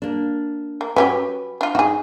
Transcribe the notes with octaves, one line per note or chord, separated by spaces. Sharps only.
A#3 D4
A#3
F#3 C#4 G4 B4
D4 F4
D#4 F#4 G#4